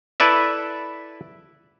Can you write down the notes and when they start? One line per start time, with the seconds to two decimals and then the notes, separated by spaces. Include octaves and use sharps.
0.20 E4 A4 B4 D5 E5